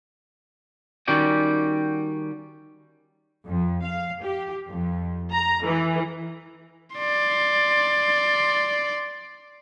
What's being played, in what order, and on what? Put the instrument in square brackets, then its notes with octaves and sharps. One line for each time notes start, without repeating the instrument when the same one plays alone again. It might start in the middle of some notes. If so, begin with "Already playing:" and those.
[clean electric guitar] D#3 G3 C#4 F#4 D5 G5
[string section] F2
F5
G4
F2
A#5
E3
[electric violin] D5 C6